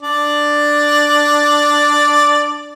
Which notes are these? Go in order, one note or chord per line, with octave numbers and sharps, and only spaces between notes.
D4 D5